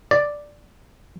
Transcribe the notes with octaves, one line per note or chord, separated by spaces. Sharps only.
D5